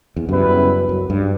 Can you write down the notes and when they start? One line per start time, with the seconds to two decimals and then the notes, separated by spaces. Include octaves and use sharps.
0.16 E2
0.29 F#2 C#3 G3 B3 E4 B4
0.89 F#2
1.10 G2